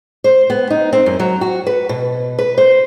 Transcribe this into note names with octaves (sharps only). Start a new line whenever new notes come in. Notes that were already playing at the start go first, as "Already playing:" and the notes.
C5
B3
D#4
C4
F#2
F#3
F#4
B4
B2
B4
C5